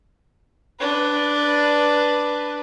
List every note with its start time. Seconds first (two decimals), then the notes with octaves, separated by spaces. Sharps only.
0.80 D4 B4